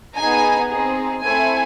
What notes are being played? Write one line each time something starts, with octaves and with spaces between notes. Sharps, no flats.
B3 D#4 G#4 G#5
C4 D#4 G#4
A3 C4 E4 A4 G#5